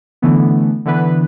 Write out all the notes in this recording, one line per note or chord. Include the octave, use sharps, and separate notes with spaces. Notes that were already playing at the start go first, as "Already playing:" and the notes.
D3 E3 A3 B3
D3 E3 B3 B4